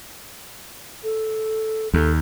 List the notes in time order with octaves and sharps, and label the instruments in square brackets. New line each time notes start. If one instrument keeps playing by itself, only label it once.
[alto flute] A4
[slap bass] D#2 [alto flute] A4